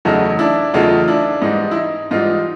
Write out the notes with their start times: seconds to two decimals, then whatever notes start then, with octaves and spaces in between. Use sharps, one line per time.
0.05 E2 C#3 F#3 A3 D#4
0.39 D4 E4
0.74 E2 C#3 F#3 A3 D#4 F4
1.08 D4 E4
1.42 G#2 E3 G3 D#4
1.71 E4
1.76 D#4
2.11 G#2 E3 G3 D#4 F4